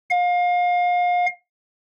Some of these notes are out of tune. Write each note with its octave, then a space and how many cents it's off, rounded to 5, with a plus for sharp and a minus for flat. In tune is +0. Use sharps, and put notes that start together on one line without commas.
F5 +30